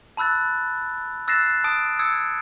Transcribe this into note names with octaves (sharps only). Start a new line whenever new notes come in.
A5 B5 E6 F#6 A6
E6 F#6 A6 A#6 C7 E7
A5 D#6 D7
D#6 E6 G#6 C#7